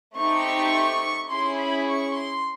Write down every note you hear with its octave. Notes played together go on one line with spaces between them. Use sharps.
A3 C4 D#4 G4 C#6
C#4 E4 G#4 C6
B5
C#6
C6